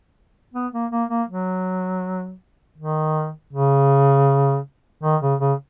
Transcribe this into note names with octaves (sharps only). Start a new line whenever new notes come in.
B3
A#3
A#3
A#3
F#3
D#3
C#3
D#3
C#3
C#3